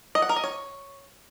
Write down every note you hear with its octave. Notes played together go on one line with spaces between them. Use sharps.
D#5
F#5
A#4
D#5
C#5